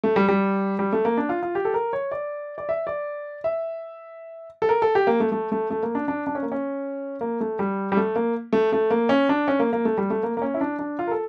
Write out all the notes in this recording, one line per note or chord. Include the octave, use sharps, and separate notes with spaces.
A3
G3
G3
G3
A3
A#3
D4
F4
F4
G4
A4
A#4
C#5
D5
D5
E5
D5
E5
A4
A#4
A4
G4
A#3
A3
A3
A3
A3
A#3
D4
D4
D4
C#4
A#3
C#4
A#3
A3
G3
G3
A3
A#3
A3
A3
A#3
C#4
D4
C#4
A#3
A#3
A3
G3
A3
A#3
A#3
C#4
E4
D4
D4
F4
A#4
A4